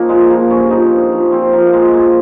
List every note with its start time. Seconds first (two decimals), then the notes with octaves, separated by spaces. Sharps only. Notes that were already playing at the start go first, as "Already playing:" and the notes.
Already playing: F3 A#3 C#4 D#4
0.09 A#2 G#3
0.30 F3 A#3
0.50 G2 C#4
0.70 F3 D#4
0.92 G2
1.12 F3
1.32 A#2 C4
1.53 F3 A#3
1.67 A#3
1.73 A#2 G#3
1.93 F3 A#3